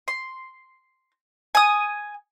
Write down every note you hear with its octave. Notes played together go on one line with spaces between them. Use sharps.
C6
G#5 D#6